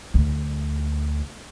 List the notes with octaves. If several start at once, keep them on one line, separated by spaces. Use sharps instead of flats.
D2